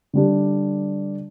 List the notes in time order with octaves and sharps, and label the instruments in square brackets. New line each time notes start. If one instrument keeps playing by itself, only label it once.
[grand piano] D3 G3 D4 G4